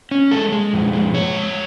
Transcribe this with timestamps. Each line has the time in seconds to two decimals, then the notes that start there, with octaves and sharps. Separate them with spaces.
0.11 C#4
0.31 G#3 A4
0.52 G#3
0.73 F2
0.93 G#3
1.14 G#3 C#5
1.35 F2